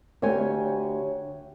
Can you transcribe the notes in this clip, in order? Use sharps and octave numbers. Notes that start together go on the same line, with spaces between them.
D2 G4 C#5 G#5